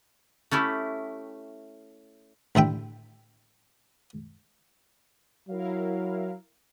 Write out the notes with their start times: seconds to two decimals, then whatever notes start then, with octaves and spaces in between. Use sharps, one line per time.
0.51 A3 C#4 E4 G4
2.55 A1 D3 E5 G5
5.49 F#3 E4 A#4 F5